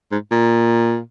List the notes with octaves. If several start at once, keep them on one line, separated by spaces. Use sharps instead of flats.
G#2
A#2